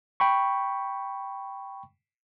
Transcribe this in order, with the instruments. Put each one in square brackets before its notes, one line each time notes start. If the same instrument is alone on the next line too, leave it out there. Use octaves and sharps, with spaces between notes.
[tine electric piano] G5 B5 C#6